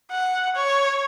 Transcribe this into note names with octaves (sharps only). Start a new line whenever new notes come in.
F#5
C#5